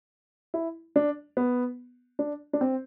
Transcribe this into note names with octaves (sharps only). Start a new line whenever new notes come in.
E4
D4
B3
D4
D4
C4